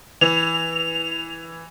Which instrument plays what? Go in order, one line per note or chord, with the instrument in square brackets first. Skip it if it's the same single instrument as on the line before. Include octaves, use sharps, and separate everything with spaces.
[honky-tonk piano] E3 [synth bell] F7